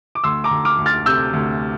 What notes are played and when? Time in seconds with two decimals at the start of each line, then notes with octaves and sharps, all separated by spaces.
0.15 D6
0.24 D2 C6 E6
0.44 A#5 D6
0.51 D2
0.65 D6 F6
0.78 D2
0.86 F6 A6
1.05 C3 E6 G6
1.33 D2